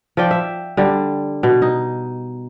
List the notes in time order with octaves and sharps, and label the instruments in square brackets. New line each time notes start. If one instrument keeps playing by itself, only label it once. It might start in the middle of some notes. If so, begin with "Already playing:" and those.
[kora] F3 F4 D5 G5
E5
D3 G3
B2
D#4